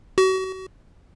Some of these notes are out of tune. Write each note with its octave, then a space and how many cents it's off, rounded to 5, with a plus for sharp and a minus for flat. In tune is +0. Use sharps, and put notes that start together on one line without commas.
F#4 +35